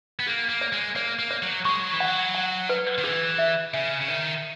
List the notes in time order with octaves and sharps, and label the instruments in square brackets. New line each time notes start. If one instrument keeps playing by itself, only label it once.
[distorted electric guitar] B3
[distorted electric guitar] A#3 [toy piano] G#4
[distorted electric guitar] A#3
[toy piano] C#5
[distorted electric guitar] G#3
[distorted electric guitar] A#3 [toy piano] C#5
[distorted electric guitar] A#3
[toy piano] C#5
[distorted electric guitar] F#3
[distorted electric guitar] G#3 [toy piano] C#6
[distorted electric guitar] F#3
E3
[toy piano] F#5
[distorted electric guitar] F#3
[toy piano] F#5
B4
[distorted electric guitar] D#3
[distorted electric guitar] E3 [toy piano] G#4
[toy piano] E5
[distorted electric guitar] C#3 [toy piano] E5
[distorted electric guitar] C#3
[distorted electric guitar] D#3 [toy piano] C#5